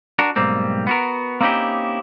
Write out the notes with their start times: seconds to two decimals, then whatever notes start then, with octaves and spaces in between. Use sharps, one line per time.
0.19 D4 F#4 A#4
0.36 B1 G#2 G3 A#3 C4
0.87 B3 F#4 A#4
1.41 A#3 C4 C#4 D#4 E4 G4